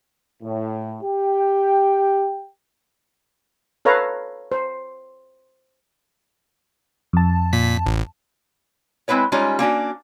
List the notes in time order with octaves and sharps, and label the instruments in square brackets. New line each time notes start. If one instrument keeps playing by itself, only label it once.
[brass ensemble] A2
G4 G5
[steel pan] A4 B4 C#5 F5 A#5
C5
[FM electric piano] F2 A5
[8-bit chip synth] A#2 B6
A1
[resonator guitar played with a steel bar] G#3 C4 E4 B4 C#5
G3 G#3 C#4 D#4 F4
A#3 C#4 D4 F#4